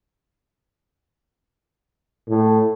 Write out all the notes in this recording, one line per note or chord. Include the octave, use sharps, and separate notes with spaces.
A2